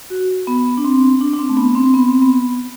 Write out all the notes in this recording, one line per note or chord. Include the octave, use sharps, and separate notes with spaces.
F#4
B3
D4
C4
D4
D4
C4
A3
B3
C4
B3
C4
B3